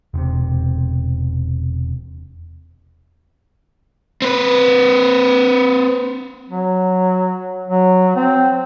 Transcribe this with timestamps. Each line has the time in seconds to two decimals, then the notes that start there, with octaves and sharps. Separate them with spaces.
0.14 E1 C3
4.22 C4 B4
6.50 F#3
7.68 F#3
8.16 C4